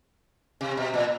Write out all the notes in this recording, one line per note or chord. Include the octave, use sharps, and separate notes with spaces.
C3
B2
A#2